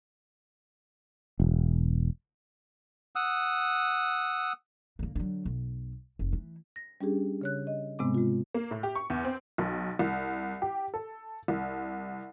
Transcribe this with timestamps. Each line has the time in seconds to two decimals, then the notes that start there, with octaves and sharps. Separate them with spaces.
1.40 E1
3.16 F#5 D#6 E6
4.99 D3 A#3
5.15 D3 F#3
5.46 B1
6.19 F1
6.33 E3
6.76 A#6
7.01 G3 C#4 D4 G4 G#4
7.41 C#3 C#5 F#6
7.67 D#5
7.99 G#2 C3 G#3 B3 C4 D6
8.15 G#3 F4
8.54 A#3
8.71 A2
8.83 G4
8.95 C#6
9.10 E2
9.25 C4
9.58 B1
9.99 C2
10.62 G4
10.94 A4
11.48 C2